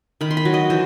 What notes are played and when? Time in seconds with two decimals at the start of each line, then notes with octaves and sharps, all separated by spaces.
0.21 D#3 B5
0.31 C6
0.37 B5
0.45 F#3
0.54 D#5
0.70 E3 C5